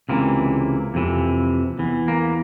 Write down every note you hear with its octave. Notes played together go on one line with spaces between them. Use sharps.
C#2 C3 E3 A#3
F2 C3 E3
E2 E3
A#3